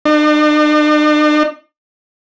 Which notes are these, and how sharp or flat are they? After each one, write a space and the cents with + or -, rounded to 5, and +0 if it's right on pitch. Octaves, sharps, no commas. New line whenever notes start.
D4 +45